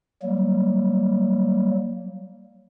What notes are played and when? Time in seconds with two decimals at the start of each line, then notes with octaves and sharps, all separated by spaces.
0.22 F#3 G3 A#3